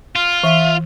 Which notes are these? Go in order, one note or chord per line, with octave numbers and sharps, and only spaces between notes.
F4 F6
E3 E5